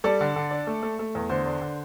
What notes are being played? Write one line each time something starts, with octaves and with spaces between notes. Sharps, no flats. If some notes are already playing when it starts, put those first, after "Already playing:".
G3 A4 D5
D3
D3
D4
A3
A3
A3
E2
D3 C5
D4
D3